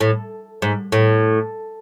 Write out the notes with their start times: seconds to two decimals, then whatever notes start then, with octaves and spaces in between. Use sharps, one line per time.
0.01 A2
0.62 G#2
0.92 A2